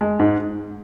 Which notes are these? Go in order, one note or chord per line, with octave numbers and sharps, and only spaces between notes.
G#3
G#2